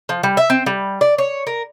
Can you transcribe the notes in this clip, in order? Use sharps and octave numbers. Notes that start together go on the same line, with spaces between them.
F3
G3
E5
C4
G3
D5
C#5
A#4